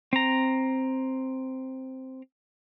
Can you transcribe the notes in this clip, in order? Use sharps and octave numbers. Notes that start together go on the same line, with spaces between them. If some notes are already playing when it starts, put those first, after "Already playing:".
C4 A#5